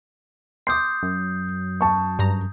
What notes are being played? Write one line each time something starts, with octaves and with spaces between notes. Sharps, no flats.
C6 D6 D#6 G6 C7
F#2
A5 C#6
G2 A#5